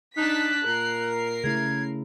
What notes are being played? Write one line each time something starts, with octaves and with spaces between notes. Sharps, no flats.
D4 D#4 A5 F#6 B6
A#2 A#4 C7
C#3 A3 E4 G#6